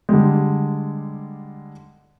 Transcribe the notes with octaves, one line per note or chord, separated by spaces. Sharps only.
D3 G3 G#3